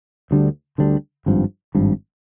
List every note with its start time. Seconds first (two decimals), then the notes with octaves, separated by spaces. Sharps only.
0.31 D2 D3 G3 D4
0.78 D2 D3 G3 D4
1.26 G#1 G2 F3
1.75 G#1 G2 F3